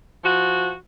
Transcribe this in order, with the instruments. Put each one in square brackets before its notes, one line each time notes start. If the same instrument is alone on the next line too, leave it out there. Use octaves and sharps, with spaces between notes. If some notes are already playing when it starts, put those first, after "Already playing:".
[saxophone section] F3 F#4